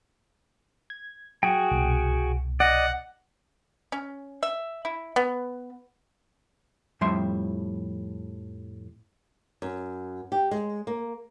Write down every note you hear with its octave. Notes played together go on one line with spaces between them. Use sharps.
G#6
F#3 F#4 G#4 G5
C2 B2
D5 D#5 F#5
C#4
E5
E4
B3
F2 A2 F3 G3 E5 C6
F#2
G4
G#3
A#3